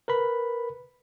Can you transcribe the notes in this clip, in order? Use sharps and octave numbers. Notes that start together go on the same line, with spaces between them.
A#4 B4 B5